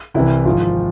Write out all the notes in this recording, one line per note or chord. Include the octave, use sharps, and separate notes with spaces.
C2 C3 E3 E4
G#1 G#2 F3 F4